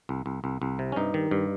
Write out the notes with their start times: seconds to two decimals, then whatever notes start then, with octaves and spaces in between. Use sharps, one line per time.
0.09 C2
0.26 C2
0.44 C2
0.62 C2
0.79 C3
0.92 C#4
0.96 G2 D#4
1.14 D#3
1.31 G2